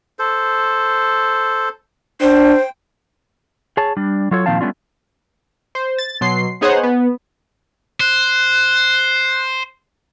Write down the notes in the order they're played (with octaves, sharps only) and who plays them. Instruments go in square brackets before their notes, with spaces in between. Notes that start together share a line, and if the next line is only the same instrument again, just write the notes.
[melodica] A4 C5
[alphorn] D4 [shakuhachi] C5 [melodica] G5
[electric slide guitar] G#4 C#5 A5
G3 D4
F#3 F4 A4 C#5
A#2 D#3 F3 C4 F5 A5
G3 A3 B3 C#4 D4 F4
[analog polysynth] C5
A6
B2 F#3 C6 C7
B3 D#4 G#4 C5 C#5 F#5
B3
[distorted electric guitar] C5 [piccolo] F#6